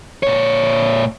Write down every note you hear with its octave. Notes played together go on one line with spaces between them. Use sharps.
A#2 C#5